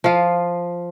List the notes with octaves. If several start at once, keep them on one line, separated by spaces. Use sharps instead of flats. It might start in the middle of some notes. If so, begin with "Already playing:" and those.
F3 F4